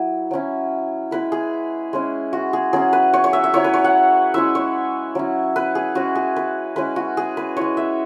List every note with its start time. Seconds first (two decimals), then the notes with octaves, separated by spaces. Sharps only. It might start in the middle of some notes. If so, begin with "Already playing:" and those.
Already playing: F#3 E4
0.31 F#3 C#4 E4
1.11 G#3 E4 B4
1.32 G#4
1.93 G#3 C#4 E4
2.33 F#4
2.53 G#4
2.73 F#3 C#4 E4 G#4
2.93 B4
3.13 C#5
3.24 C#5
3.33 E5
3.44 E5
3.54 F#3 E4 C#5
3.64 B4
3.74 C#5
3.84 F#5
4.34 G#3 C#4 E4 E5
4.55 C#5
5.15 F#3 C#4 E4
5.56 B4
5.75 G#4
5.95 G#3 C#4 E4 F#4
6.15 G#4
6.36 B4
6.76 G#3 C#4 E4 B4
6.96 F#4
7.17 G#4
7.37 B4
7.57 G#3 E4 C#5
7.77 E5